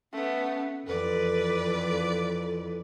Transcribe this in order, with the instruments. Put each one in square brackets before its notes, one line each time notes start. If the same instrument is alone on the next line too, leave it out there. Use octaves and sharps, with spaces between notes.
[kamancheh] A3 B3 [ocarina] C#4
[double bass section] F2 E3 [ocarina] A4 [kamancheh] B4 D5